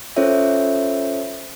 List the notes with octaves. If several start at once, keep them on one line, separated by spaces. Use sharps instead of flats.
C#4 F4 A4 C5 C#5 E5